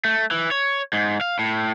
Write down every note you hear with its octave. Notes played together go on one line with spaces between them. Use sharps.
A3
E3
C#5
G#2
F5
A2